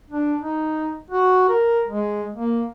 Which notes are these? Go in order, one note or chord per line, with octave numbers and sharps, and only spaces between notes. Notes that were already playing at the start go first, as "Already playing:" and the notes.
D4
D#4
F#4
A#4
G#3
A#3